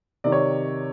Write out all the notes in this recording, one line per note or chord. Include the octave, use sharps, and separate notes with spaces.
C3 D#3 D5
C#5